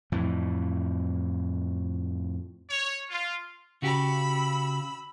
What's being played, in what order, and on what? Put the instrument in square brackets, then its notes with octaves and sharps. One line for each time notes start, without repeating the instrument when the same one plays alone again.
[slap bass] F2 A2 E3
[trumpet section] C#5
F4
[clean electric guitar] C#3 F#4 G4 [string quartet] B5 E6